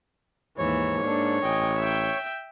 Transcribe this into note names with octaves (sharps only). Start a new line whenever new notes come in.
D#2 G#2 E3 C#5
A#3 D4 A4
A1 D#5 G5 G#5
E5 G5 G6